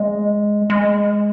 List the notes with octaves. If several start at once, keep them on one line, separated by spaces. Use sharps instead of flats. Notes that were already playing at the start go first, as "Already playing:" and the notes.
Already playing: G#3
G#3